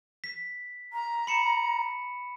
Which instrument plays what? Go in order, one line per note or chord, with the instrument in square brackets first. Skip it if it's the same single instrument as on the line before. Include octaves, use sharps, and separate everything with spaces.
[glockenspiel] B6
[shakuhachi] A#5
[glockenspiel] B5 C#7 E7